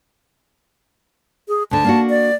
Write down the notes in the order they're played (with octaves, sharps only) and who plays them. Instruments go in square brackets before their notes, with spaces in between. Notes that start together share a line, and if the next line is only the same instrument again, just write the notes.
[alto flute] G#4
[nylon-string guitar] D2 D3 [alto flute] A5
[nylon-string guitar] A#3 D4 F#4
[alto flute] D5